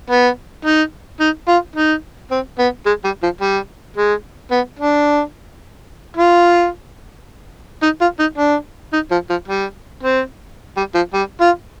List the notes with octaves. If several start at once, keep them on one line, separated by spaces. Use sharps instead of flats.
B3
D#4
D#4
F4
D#4
C4
B3
G#3
G3
F3
G3
G#3
B3
D4
F4
D#4
F4
D#4
D4
D#4
F3
F3
G3
C4
G3
F3
G3
F4